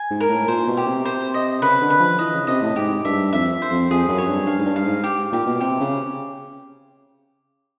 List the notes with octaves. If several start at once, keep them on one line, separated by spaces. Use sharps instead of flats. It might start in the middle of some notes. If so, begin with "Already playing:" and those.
Already playing: G#5
G#2
A#4
A2
A#2 C5
B2
G4
C3
C5
D#5
C#3 B4
D3
B4
F3
E3 D#5
C#3
C3 D#5
A2
G#2 G4
G2 E5
F2 E5
C5
F2
F2 G#4
F#2
C#5
G2
G2 F5
G#2
G2
F5
G#2
G4
A#2 G4
B2
C3 G4
C#3